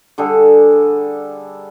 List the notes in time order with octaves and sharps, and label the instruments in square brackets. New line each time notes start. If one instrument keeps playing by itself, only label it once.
[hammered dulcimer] D3 G3 G#4 A4